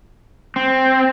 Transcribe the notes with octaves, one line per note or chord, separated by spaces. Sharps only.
C4